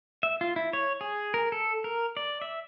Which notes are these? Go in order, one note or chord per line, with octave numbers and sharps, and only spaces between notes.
E5
F4
E4
C#5
G#4
A#4
A4
A#4
D5
E5